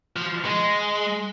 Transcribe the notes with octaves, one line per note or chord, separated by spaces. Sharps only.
F3
G#3